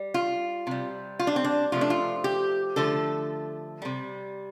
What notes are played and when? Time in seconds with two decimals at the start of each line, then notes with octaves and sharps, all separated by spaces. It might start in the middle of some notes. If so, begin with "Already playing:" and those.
Already playing: G3
0.14 F4
0.67 C3 G3
1.19 F4
1.27 D4
1.36 C4
1.44 D4
1.72 C3 F3 A3 F4
1.81 D4
1.90 F4
2.24 G4
2.76 D3 F3 A3 A4
3.82 C3 G3